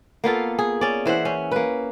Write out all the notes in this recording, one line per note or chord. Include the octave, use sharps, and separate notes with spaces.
A#3 B3 F4 A4
G#4
C#4 D5
E3 C5 E5 F#5
C#4
A#3 B4